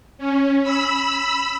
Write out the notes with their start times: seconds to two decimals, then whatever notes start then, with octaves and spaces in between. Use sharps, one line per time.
0.18 C#4
0.63 B5 E6